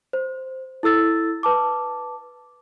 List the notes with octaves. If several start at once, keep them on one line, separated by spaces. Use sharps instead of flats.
C5
E4 A4 E6 A6
B4 A5 D6